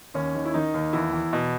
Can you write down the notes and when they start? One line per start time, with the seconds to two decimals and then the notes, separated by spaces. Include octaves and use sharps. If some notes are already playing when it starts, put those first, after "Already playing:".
0.14 D#2 C#4
0.35 D#3
0.45 E4
0.54 D#3 D#4
0.74 D#2
0.93 E2 E4
1.13 E2
1.33 B2